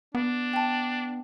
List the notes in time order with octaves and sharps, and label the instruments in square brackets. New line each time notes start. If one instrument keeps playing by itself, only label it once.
[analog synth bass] B3 [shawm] D4
[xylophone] G5 A5